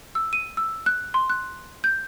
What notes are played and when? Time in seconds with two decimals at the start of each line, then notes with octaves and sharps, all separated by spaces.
0.15 E6
0.33 D#7
0.57 E6
0.86 F#6
1.14 C6
1.30 F#6
1.84 G6